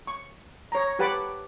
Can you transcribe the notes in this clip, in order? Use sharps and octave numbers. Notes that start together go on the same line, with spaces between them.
C#6
C#5 A#5
G4 B4 F#5 A5 B5 D6